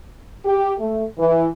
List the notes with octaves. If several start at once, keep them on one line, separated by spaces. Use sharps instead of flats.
G4
A3
E3